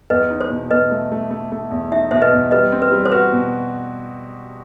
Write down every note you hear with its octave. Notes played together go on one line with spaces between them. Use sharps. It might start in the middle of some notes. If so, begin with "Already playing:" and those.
E2 B4 D#5
D#4
C5
B2
B2 B4 D#5
A3
A3
A3
A3
E2
D#4 E5
B2 C5 E5
B4 D#5
E2
G3 B4 D#5
C4
B4
G3
C5
F#4 B4
B2